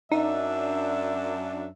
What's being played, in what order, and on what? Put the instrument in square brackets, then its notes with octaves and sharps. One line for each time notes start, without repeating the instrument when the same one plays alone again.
[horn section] F#2 D4 [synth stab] D#4 [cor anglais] E5